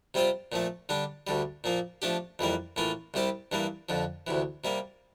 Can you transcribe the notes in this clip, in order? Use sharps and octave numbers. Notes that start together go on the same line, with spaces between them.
C3 G3 C4 F4 C5
A#2 F3 A3
D3 G3 D4
D2 D3 G3
A#2 F3 A#3
F3 A3 D4 G4
F2 E3 G3 A#3
A2 E3 A#3 F4
C2 C3 G3 C4 G4
G2 E3 G3 A#3
F2 D3 F3
D2 C3 E3
C3 G3 A#3